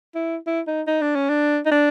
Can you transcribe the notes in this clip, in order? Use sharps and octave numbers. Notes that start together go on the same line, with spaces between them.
E4
E4
D#4
D#4
D4
C#4
D4
D#4
D4